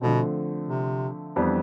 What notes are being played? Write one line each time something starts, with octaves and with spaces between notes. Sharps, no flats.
B2 D3 F3 A3 C4
C3
F2 E3 G3 B3 D4